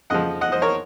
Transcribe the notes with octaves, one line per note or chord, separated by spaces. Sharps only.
F2 C#3 F3 D#5 F#5
D#5 F#5
C5 D#5
A#4 C#5